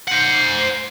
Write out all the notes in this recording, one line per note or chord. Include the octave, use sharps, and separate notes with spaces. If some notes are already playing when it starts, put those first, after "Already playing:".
C5 F#5